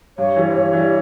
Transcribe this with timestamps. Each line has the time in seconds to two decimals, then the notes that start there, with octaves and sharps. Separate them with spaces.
0.18 G2 C#5
0.36 E3 G3
0.49 C5
0.54 G2 C#5
0.73 E3 G3